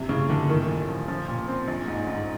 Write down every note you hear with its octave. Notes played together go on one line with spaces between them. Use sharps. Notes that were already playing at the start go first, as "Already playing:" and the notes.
Already playing: A#1 C3 E3
A2 C#3
A#1 D3
A2 D#3
A#1
F3
F3
A#2
C4
A#1
G#2
G#2